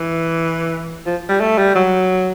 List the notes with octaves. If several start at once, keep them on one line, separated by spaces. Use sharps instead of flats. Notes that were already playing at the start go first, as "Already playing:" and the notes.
Already playing: E3
F3
G3
A3
G3
F#3